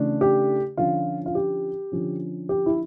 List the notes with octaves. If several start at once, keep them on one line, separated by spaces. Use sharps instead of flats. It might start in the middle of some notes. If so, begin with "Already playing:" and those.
Already playing: C#3 E3 A3 D4
G4
D3 F3 C#4 F4
F4
G4
D3 F3 C#4
G4
E4